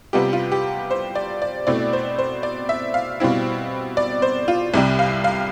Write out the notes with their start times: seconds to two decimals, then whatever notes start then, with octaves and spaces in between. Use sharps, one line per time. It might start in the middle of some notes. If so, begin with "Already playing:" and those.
0.13 C3 G3 B3 F4 G4
0.33 F4
0.52 G4
0.91 C5
1.15 D5
1.42 D5
1.67 B2 A3 C4 E4 D5
1.93 C5
2.18 C5
2.43 D5
2.69 E5
2.94 F5
3.20 B2 G3 C4 E4
3.97 D5
4.22 C5
4.48 F4
4.74 C2 C3 G3
4.99 F5
5.24 F5